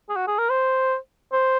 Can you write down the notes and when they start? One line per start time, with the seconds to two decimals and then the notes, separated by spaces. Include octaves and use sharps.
0.10 G#4
0.16 F#4
0.27 G#4
0.38 A#4
0.49 C5
1.33 C5